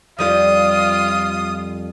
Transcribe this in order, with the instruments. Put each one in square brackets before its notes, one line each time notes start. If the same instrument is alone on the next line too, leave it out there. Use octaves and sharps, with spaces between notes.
[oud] F2 G3 D5 [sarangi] F4 [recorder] D#6